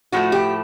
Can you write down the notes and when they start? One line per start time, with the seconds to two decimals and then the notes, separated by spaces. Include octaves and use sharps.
0.12 A2 F3 A3 F#4
0.32 G4